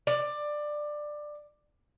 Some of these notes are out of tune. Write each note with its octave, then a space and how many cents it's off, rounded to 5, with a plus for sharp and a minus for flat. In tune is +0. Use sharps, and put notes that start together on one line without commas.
D5 +15